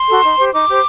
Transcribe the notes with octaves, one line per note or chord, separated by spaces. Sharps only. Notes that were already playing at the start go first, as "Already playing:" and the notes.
Already playing: C6
F#4 A4
D#4
G4 C5
D#4 D6
G4 C5